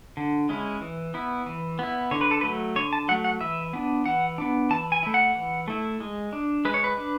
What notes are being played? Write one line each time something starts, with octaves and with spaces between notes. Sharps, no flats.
D3
G#3 C#4 E4
E3
B3 E4
E3
B3 E4
D3 C#5
B4
A4
F#3 A3 B4
D3 C#5
A5
F#3 A3 F#5
F#5
E3 E5
B3 D4
E3 F#5
B3 D4
E3 A5
G#5
A3 E4
F#5
E3
A3 E4
G#3
D4
G#3 B4
C#5
B4
D4